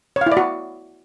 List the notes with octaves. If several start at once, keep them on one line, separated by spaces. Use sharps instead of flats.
C#5
F5
E4
D5
F#4